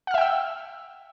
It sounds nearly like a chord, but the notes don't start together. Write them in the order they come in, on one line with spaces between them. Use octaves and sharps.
F#5 F6 E5 G5 E6